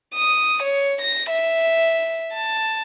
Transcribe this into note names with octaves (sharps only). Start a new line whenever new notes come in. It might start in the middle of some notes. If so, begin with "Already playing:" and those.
D#6
C#5
A#6
E5
A5